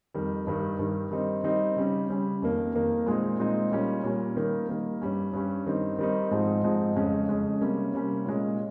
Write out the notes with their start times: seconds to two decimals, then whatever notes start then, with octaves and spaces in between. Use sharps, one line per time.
0.14 F2 D#3 G3
0.47 G2 D#3 G3
0.79 G2 D#3 G3
1.11 D#3 G3 C4 D#4
1.44 D#3 G3 C4 D#4
1.76 C#3 G3 C#4
2.09 C#3 G3 C#4
2.42 F2 D#3 A#3
2.74 F2 D#3 A#3
3.06 A#2 G#3 C4 D#4
3.39 A#2 G#3 C4 D#4
3.72 A#2 G3 C#4
4.04 A#2 G3 C#4
4.37 D#3 G3 A#3
4.69 D#3 G3 A#3
5.02 G2 G3 C#4
5.33 G2 G3 C#4
5.66 D#3 G3 C4 D#4
5.98 D#3 G3 C4 D#4
6.31 G#2 F3 G#3 C4 D#4
6.64 G#2 F3 G#3 C4 D#4
6.96 F2 C#3 G#3 C#4
7.29 F2 C#3 G#3 C#4
7.61 C3 G3 A#3 C#4
7.94 C3 G3 A#3 C#4
8.26 A#2 G#3 C#4